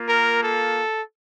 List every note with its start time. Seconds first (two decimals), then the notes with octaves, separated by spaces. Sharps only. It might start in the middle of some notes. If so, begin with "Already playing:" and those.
Already playing: A#3 F4
0.09 A#4
0.43 A4